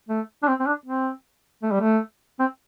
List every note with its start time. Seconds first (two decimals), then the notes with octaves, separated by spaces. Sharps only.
0.09 A3
0.43 D4
0.48 C4
0.60 C4
0.67 D4
0.86 C4
1.63 A3
1.72 G3
1.80 A3
2.39 C4